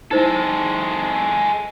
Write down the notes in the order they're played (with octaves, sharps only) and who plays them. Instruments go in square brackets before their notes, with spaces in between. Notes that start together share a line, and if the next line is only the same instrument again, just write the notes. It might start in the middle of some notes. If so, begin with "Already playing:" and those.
[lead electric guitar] G#3 A4 [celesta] D#4 E4 C5